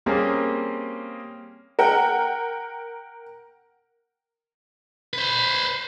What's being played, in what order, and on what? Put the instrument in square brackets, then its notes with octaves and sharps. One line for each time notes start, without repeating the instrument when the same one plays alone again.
[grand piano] G3 A#3 C4 C#4 G#4
[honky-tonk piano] A#4 F#5 G5
[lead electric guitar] B4 C5